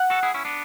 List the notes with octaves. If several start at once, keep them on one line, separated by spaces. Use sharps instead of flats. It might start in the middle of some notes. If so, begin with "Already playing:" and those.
Already playing: F#5
F#4 A4
E4 G#4
C#4 E4
B3 D4